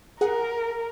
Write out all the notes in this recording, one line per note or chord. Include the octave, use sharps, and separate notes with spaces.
G#4 A#4 F#5